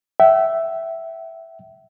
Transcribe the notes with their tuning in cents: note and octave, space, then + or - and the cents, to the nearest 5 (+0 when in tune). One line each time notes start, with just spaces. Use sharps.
E5 +0 G5 -45